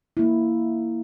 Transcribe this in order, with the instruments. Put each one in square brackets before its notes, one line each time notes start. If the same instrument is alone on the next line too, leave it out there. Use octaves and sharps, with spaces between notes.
[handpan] A#3 E4